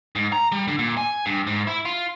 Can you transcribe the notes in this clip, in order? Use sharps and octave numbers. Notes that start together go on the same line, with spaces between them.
G#2
A#5
G3
D3
A#2
G#5
G2
G#2
E4
F4